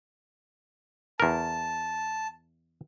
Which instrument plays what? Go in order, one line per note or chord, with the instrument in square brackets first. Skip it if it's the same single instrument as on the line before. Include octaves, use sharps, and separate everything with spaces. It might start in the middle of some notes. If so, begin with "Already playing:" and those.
[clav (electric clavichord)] E2 A#4 [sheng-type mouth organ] A5